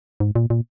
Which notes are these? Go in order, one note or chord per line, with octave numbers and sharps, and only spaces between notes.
G#2
A#2
A#2